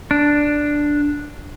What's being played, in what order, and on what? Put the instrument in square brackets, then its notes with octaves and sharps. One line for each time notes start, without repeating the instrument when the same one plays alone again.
[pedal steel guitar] D4